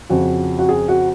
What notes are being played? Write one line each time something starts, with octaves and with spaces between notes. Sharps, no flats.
F2 C#3 F3 F#4
F#4
G#4
F#4